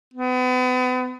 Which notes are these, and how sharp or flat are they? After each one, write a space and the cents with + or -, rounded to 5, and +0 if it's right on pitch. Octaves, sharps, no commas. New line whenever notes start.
B3 +40